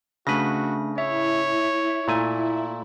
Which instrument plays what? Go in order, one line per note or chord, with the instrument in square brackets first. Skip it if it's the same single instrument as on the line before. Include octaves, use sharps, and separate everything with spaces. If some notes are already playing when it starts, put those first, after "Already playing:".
[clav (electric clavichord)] C#3 B4 [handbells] A3 D4 A#6 [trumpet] F#4
[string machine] E4 [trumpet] C#5 [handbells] E5
[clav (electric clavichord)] A#2 A3 G#5